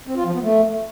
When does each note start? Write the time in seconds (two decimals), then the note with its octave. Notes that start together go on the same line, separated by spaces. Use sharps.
0.07 C4
0.16 F4
0.25 F3
0.34 B3
0.43 A3